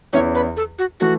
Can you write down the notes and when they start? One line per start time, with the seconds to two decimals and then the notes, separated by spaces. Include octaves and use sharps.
0.13 E2 E3 C#4 E4 C#5
0.35 B4
0.57 A4
0.79 F#4
1.00 E3 A3 F#4